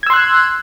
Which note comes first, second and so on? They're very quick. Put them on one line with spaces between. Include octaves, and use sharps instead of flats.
G#6 E6 C6 F#6